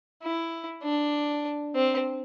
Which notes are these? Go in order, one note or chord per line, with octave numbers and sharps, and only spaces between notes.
E4
D4
C4